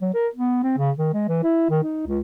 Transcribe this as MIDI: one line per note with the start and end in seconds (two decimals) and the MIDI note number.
0.01 0.10 54
0.14 0.27 70
0.35 0.58 59
0.63 0.76 60
0.78 0.91 49
0.98 1.11 51
1.13 1.24 56
1.28 1.39 52
1.43 1.66 64
1.70 1.81 51
1.83 2.03 63
2.07 2.20 37